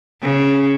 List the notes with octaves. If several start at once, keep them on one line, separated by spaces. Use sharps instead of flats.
C#3